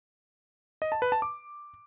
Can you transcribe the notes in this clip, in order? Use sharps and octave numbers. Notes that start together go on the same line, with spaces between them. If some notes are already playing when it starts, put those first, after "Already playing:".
D#5
A5
B4
A5
D6